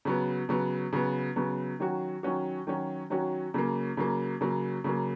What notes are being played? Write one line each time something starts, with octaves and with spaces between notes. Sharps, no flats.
C#3 F#3 B3
C#3 F#3 B3
C#3 F#3 B3
C#3 F#3 B3
D#3 F#3 C#4 F#4
D#3 F#3 C#4 F#4
D#3 F#3 C#4 F#4
D#3 F#3 C#4 F#4
C#3 F#3 A#3
C#3 F#3 A#3
C#3 F#3 A#3
C#3 F#3 A#3